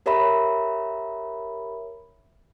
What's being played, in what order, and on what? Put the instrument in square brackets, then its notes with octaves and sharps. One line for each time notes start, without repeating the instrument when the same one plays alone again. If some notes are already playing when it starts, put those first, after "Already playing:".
[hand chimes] G4 A#4 C#5 E5 A#5 B5